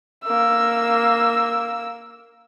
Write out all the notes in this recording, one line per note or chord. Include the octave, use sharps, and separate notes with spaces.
A#3 E6